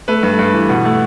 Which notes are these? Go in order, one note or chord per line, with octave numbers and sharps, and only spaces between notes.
A3 B4
G2
G2
E3
B2
A3